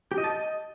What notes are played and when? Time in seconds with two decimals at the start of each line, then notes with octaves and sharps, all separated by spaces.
0.12 G4
0.18 D#5
0.24 A5
0.30 D#5